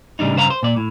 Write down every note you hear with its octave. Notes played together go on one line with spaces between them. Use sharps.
A2 C#3 G3 D4 D#4
G2 C#3 C5 F5 A#5
C5
A#2 D5
A2